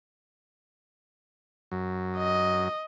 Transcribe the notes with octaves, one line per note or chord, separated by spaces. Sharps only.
F#2
D#5